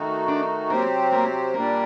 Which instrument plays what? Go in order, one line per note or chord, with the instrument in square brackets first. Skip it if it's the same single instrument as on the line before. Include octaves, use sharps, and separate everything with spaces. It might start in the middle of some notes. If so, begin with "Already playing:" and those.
Already playing: [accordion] D#3 A3 D#4 F#4
[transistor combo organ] D4
[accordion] C3 F#3 C4 G4 C5 [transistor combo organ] A#3
[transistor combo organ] A#3
[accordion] A#2 G3 D4 G4 D5 [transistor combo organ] A#3